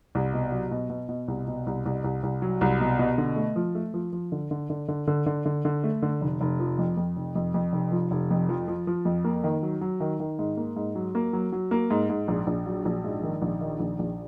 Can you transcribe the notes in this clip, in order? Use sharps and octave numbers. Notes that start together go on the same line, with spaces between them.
C2
B2
F#3
B2
B2
B2
C2
B2
C2
C2
C2
C2
F#3
C2
B2
B2
D3
A3
F3
A3
F3
F3
D3
D3
D3
D3
D3
D3
D3
D3
A3
D3
F1
F1
F3
F2
F2
F1
F2
F2
F1
F3
F1
F2
F3
F3
F3
F2
A#3
D#3
F#3
F#3
D#3
D#3
G#2
A#3
G#2
F#3
A#3
F#3
F#3
A#3
G#2
G#2
A#1
A#1
F#3
A#1
G#2
D#3
A#1
D#3
A#1
A#1